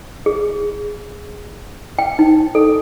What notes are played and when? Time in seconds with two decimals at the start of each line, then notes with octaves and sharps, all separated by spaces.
0.26 G#4
1.99 G5
2.19 D#4
2.55 A4